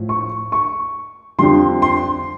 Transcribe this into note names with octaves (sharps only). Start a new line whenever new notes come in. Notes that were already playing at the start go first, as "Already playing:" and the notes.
Already playing: A2 F3
C#6
C#6
F2 D3 G3 C6
C6